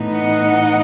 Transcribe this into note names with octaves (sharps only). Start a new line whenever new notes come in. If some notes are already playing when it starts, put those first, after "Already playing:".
Already playing: A2 E3 B3 D#4
D#5 F#5